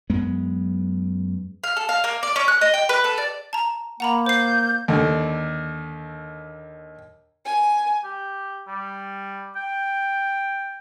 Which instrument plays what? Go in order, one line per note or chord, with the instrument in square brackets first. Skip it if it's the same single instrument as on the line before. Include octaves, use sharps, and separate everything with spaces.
[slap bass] F#2 G#3 B3
[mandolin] F5
A4
F5
A#3
D5
C#4
F#6
D#5
G5
B4
A4
D5
[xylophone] A5 A#5
[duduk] A#3 [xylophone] F#5 A#5 B5
[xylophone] C5 C7 [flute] G6
[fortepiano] D#2 D3
[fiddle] G#5
[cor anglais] G4
G3
G5